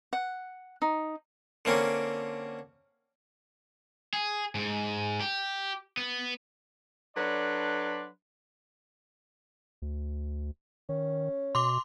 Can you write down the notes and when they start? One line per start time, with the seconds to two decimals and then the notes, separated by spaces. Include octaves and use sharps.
0.13 F#5
0.82 D#4
1.65 D3 A#3 C4 C#4
4.13 G#4
4.55 G#2
5.20 G4
5.97 B3
7.16 F#3 D4 A4 B4 D5 C6
9.82 D2
10.89 D#3 C#4
11.55 B2 C6 D6